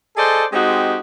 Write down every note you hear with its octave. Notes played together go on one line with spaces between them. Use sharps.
G#4 A4 C5 D5 D#5
G#3 C4 D#4 F#4 G4